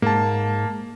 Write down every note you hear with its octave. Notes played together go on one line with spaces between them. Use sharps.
G#2 A#3 A5